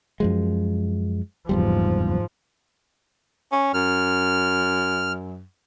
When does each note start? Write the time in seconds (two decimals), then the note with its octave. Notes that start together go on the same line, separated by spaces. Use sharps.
0.20 F#2 F3 G#3
1.49 F#1 E2 G#2 F3 G3
3.52 C#4
3.74 F#2 F6